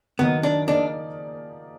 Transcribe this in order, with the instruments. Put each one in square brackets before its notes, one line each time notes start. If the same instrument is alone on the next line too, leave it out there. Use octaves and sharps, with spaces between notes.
[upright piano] D#3 F#3 A#3 D#4 [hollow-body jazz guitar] B3
[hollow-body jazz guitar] D4
[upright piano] F3 A#3 D#4 G#4 D5 [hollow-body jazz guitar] D4